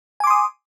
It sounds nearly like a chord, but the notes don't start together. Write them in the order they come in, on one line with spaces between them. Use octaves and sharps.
G#5 D6 C6 D#6